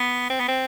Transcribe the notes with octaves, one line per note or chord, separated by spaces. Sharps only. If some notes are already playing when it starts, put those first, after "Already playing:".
Already playing: B3
C4
B3
C4